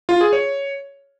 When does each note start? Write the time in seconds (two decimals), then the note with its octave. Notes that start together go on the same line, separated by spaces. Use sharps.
0.09 F4
0.21 G#4
0.33 C#5